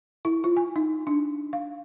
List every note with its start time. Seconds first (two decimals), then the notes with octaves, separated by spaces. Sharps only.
0.25 E4
0.44 F4
0.57 G#5
0.76 D#4
1.07 D4
1.53 F5